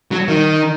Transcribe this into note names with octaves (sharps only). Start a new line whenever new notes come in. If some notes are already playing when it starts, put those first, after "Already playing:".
F#3
D#3